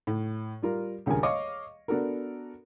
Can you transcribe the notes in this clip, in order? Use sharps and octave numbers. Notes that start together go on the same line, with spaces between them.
A2
G3 F4 A#4
D#1 C#2 G2 F4 A#4 G#5
C#5 D#5 F5 C#6 D6
B3 D4 F#4 A4 A#4